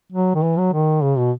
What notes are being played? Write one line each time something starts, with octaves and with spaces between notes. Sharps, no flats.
F#3
D#3
E3
F#3
D#3
C#3
B2